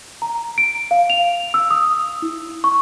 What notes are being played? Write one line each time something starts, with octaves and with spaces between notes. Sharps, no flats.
A#5
D7
F5
F7
E6
D#6
E4
C#6